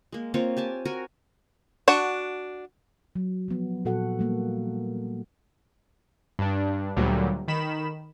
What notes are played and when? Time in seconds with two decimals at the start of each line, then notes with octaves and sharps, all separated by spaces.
0.12 G#3 A#3
0.34 A#3 C4 F4 C#5
0.57 G4 G#5 A5
0.85 F#4 A#4 G#5
1.88 D4 F#4 F#5
3.16 F#3
3.48 F3 B3
3.85 A#2 F#4 A4 F#5
4.19 G3 A#3
6.39 G2 D4
6.97 D2 A#2 F#3 G3
7.48 D#3 B5 E7